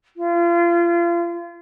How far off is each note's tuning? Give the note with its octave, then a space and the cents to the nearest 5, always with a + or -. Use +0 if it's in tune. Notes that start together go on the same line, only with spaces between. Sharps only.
F4 -35